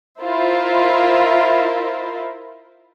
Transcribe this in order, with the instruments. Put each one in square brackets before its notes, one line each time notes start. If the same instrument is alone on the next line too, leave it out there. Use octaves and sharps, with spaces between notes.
[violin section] E4 F4 A#4 C5 D#5 E5